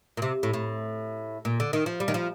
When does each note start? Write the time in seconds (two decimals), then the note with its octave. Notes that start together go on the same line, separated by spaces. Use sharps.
0.17 A#2
0.22 C3
0.43 A2
0.54 A2
1.45 A#2
1.60 D3
1.73 D#3
1.86 F3
2.00 G3
2.08 D#3
2.14 F3